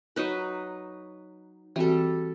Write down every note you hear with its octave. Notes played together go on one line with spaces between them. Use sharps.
F#3 D#4 B4
E3 G3 C4 F#4 A4